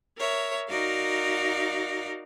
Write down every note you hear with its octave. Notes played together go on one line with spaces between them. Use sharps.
A#4 C#5 E5
D#4 F#4 A#4 D5 F5